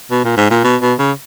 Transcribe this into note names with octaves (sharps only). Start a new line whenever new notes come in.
B2
A#2
G#2
A#2
B2
B2
C#3